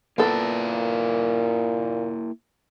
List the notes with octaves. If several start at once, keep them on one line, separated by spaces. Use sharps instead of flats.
A#2 A#3 B3 E4 A4 A#4